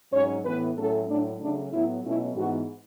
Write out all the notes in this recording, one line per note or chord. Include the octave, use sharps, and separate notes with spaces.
G#2 F#3 C#4 C#5
A2 E3 B3 B4
A2 F#3 A3 C#4 A4
A2 F#3 A3 D4
C#3 F#3 A3 C#4 D4
A2 F#3 B3 E4
B2 F#3 A3 C#4 E4
G#2 E3 B3 F#4